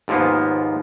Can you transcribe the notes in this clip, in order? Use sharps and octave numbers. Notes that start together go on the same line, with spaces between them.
D#2 G#2 F3 A#3 B3